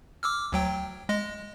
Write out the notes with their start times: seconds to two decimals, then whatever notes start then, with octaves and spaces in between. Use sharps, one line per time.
0.23 D6 E6 F6
0.52 D2 F#3 G5
1.09 G#3 D#5